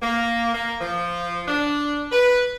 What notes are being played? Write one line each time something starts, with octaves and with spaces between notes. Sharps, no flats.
A#3
A#3
F3
D4
B4